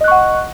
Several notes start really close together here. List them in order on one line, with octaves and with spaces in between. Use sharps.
D#5 F#6 C#6 F#5